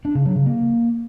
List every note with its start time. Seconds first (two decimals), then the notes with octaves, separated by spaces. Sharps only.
0.05 D4
0.15 C#3
0.25 F#3
0.36 C#3
0.46 A#3